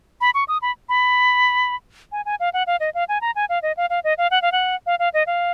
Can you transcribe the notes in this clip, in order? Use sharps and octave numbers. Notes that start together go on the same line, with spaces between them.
B5
C#6
D#6
B5
B5
G#5
G#5
F5
F#5
F5
D#5
F5
G#5
A#5
G#5
F5
D#5
F5
F5
D#5
F5
F#5
F5
F#5
F5
F5
D#5
F5